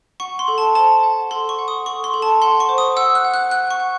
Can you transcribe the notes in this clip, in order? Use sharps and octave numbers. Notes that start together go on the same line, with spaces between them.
F#5 C#6
C6
A4
A5
C5 A5
F#5
A4 C6
C#6
F#5
D#6
A4 C#6
C6
A4
A5
F#5 C6
C#6
C5
D#6
F#5 E6
F#6
F#5
F#6
F#5 F#6
C#6
F#5